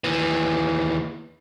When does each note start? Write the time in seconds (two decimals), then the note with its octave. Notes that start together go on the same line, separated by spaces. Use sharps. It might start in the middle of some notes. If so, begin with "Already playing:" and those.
0.04 D#2 E3